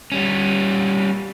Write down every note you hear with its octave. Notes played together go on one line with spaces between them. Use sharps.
G3 C#4